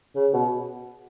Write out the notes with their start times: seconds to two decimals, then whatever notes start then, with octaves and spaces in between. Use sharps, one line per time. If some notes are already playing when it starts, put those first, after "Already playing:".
0.15 C#3
0.33 B2